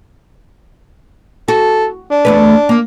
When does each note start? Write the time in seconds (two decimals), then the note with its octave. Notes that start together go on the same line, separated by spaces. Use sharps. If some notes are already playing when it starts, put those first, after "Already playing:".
1.48 F#4 A4
2.11 D4
2.25 E2 A3 B4
2.69 A#3